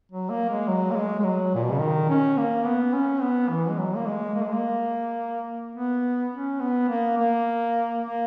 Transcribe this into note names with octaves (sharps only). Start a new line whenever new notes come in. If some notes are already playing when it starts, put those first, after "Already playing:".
F#3
A#3
G#3
F#3
A#3
G#3
G#3
F#3
A#2
B2
C#3
D#3
C#4
A#3
B3
C#4
B3
E3
G#3
F#3
A#3
G#3
A#3
G#3
A#3
B3
C#4
B3
A#3
A#3
A#3